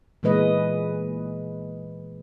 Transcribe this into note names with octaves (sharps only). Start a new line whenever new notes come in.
A#2 E3 G#3 B4 D#5